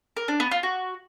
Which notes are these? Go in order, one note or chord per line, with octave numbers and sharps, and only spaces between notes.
A#4
D4
B3
F4
F#4